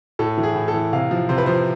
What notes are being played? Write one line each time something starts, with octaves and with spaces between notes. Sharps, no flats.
A2 A4
E3
G#4
A2
A4
E3
C3 F5
F3
C3 C5
B4
F3 C5